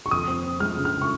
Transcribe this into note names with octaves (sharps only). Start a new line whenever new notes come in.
C#6
F2 D#6
C4
C4
G#3 F6
C#3
F6
C#6